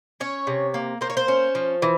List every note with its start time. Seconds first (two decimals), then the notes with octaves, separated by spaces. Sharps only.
0.20 C#4 C#5
0.47 C3
0.74 A#3
1.01 A#3 C5
1.10 C#5
1.17 C5
1.28 C#4
1.55 F3
1.82 E3